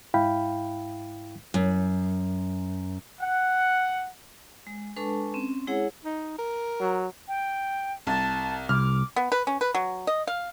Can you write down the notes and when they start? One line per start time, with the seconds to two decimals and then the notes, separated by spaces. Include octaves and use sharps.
0.14 G#2 E4 F5 G5 B5
1.54 F#2
3.21 F#5
4.67 G#3
4.97 G#3 D4 A4 B4 A5 C#6
5.34 C4 C#4
5.67 G#3 E4 G#4 C#5 F#5
6.05 D#4
6.39 A#4
6.80 F#3
7.28 G5
8.07 C2 A5
8.69 C2 D6 F6
9.16 B3
9.32 B4
9.47 C#4
9.61 B4
9.74 F#3
10.07 D#5
10.27 F5